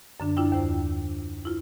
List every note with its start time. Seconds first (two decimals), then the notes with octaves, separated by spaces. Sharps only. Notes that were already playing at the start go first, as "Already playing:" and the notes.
0.20 F#2 D3 D4
0.37 D4 E4 F4 G5
0.52 D#2 C5
1.45 E4 F4